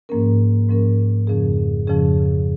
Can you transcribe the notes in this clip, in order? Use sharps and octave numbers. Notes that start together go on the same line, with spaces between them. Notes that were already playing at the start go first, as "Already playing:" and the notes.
G#2 F3 A#3 C#4 A#4
G#2 F3 A#3 C#4 A#4
F2 C#3 F3 C#4 G#4
F2 C#3 F3 C#4 G#4